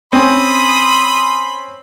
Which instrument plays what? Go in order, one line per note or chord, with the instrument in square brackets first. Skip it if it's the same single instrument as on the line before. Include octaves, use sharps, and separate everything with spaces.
[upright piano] C4 C#4 [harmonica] B5 C6 [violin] D#6